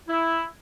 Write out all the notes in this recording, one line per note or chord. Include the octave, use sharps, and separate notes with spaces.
E4